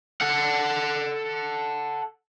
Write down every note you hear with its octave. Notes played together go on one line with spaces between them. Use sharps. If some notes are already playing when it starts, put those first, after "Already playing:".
A4 F#5